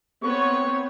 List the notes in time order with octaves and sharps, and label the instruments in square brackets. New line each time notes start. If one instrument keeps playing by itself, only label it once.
[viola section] B3 C4 C#5 [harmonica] C#6